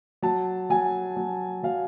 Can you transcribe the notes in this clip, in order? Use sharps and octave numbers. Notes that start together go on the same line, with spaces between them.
F#3 A5
F#3 G#5
F#3
F#3 F5